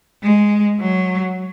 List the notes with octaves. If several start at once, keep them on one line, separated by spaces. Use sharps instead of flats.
G#3
F#3